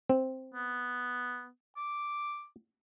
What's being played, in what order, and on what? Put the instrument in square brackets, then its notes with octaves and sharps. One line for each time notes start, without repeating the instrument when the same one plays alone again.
[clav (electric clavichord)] C4
[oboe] B3
D6